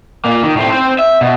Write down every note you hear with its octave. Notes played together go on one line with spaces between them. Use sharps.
A#2 A#3
D#3
A2 C4
C4 C5
E5
B2